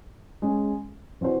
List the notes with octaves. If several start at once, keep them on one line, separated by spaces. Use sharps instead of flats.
G#3 C#4 G#4
E3 C4 F#4 C5